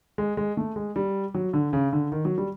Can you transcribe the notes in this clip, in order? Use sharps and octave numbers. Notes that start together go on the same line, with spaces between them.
G#3
G#3
A3
G#3
G3
F#3
D3
C#3
D3
D#3
F#3
G3